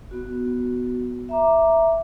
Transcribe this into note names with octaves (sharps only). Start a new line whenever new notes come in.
B3 F#4
E5 A#5 D6